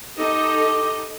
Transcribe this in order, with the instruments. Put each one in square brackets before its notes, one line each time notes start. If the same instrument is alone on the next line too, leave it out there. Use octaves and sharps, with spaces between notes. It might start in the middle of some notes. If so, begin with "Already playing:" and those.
[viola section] D#4 A4 D#5 [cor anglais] G4